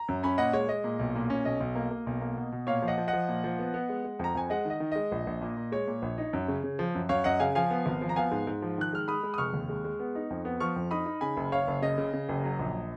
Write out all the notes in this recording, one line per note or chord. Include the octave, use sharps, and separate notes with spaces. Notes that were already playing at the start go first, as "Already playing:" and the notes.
Already playing: A#5
F#2
C#4 G#5 B5
A#2 D#5 F#5
G#3 C#5
G#3 D#5
A#2
B1
A#2
C#4
B1 D#5
B1
A#3
A#3
B1
A#3
B2
B2
A#2 C#5 F5
F3
D#5 F#5
F3
D#5 F#5
F3
A#2
F3
B3
B3
G#3
G#3
F2 A#5
F2 G#5
G#3 D#5 F#5
D#3 D#5
D#3
G#3 D#5
A#1
A#1
A#2
A#2
G#3 C#5
A#2
A#1
D#4
F#2
C#3
C#3
F3
F#2
F#2 C#5 F5
F#2 D#5 F#5
C#3 F5 G#5
F3 F5 G#5
B3
G#1
F3
A#5
B3 F5 G#5
G#2
G#2
F3
D#3 F#6
G#3 F6
G#3 B5 D#6
G#3
D#6
F1 C#6 F6
D#2
G#3
G#3
B3
D#4
F2
B3
F3 C#6 F6
F2
D#4 B5 D#6
D#4
C#3 G#5 B5
F#1
F#1 C#5 F5
F#1
C#3 D#5
C#3
C#3
F#1
F#3
A#1